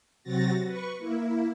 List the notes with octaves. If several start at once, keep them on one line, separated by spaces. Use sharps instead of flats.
C3 F#3 C4 F#4 A6 A#6
B4 C#6
A#3 E4